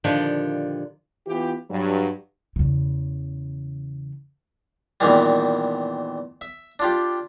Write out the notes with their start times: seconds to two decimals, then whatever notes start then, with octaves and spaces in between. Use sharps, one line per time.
0.04 A#2 D3 D#3 F3 D4 G4
1.27 E3 B3 F4 G4
1.70 G2 F#3
2.56 E2 C#3
5.00 E2 A#2 D#3 E3 G3
6.41 E5
6.79 D4 F4 G4